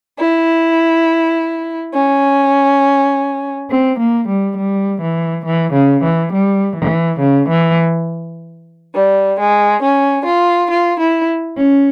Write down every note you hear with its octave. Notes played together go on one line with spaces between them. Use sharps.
E4
C#4
C4
A#3
G3
G3
E3
E3
C#3
E3
G3
E3
C#3
E3
G3
G#3
C#4
F4
F4
E4
C#4